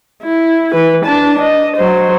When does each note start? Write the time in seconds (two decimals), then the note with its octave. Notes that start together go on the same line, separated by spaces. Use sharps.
0.23 E4
0.74 E3 B4
1.05 D4 A5
1.42 D#5
1.77 F#3 C5